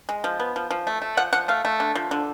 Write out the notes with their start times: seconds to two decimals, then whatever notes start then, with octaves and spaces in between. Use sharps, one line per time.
0.09 G#3
0.24 F3
0.40 B3
0.56 F3
0.71 F3
0.87 A3
1.02 A3
1.17 F3 F#5
1.33 F3 F#5
1.48 A3 F5
1.65 A3
1.80 D3
1.95 F3
2.11 D3